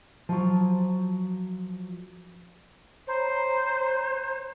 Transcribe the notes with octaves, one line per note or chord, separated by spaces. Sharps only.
F3 F#3
C5 C#5 A#5 B5